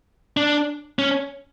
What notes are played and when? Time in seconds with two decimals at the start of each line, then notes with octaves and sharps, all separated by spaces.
0.37 D4
0.99 C#4